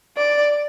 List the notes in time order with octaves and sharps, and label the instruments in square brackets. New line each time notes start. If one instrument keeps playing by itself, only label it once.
[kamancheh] D5